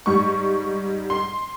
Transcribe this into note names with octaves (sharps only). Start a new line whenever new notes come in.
G#2 G3 C#6
C6